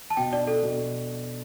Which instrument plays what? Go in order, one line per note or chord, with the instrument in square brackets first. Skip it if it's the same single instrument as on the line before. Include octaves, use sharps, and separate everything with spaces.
[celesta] A5
[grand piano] B2 [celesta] G5
[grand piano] D4 [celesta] D5
[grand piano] D4 [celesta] A4
[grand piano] B2